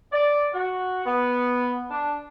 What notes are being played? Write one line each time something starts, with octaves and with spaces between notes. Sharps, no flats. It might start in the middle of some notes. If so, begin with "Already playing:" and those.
D5
F#4
B3
D4